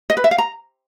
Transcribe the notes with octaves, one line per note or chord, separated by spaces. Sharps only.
D#5
B4
E5
F5
A#5